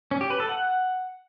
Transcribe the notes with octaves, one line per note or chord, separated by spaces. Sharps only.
C#4
G4
B4
A4
F#5